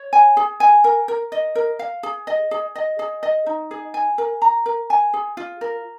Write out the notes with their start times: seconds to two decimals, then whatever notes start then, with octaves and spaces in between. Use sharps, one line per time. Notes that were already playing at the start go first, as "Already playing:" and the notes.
Already playing: C#5
0.13 G#5
0.37 G#4
0.60 G#5
0.84 A#4
1.08 A#4
1.32 D#5
1.55 A#4
1.79 F5
2.03 G#4
2.27 D#5
2.51 G#4
2.75 D#5
2.99 G#4
3.23 D#5
3.46 D#4
3.71 G#4
3.94 G#5
4.18 A#4
4.42 A#5
4.66 A#4
4.90 G#5
5.13 G#4
5.37 F4
5.61 A#4